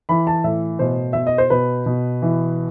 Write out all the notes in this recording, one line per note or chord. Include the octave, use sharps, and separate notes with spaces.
E3 B5
A5
A2 E5
B2 C5
B2 E5
D#5
C5
B2 B4
B2
E3